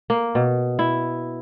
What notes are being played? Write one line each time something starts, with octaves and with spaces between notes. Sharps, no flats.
A#3
B2
E4